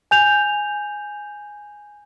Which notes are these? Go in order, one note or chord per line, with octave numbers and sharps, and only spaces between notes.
G#5 G6 F7